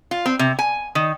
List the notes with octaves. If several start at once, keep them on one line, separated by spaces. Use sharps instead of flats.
F4
C4
C3
G#5
D#3